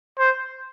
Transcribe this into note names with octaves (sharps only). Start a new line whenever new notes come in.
C5